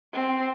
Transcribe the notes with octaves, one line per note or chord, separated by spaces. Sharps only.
C4